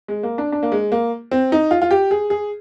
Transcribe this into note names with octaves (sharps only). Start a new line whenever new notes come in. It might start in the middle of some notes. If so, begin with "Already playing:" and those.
G#3
A#3
D4
D4
A#3
G#3
A#3
C4
D#4
F4
F4
G4
G#4
G#4